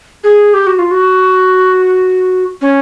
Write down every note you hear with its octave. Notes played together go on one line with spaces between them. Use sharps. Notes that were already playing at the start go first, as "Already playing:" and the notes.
G#4
G4
F#4
F4
F#4
C#4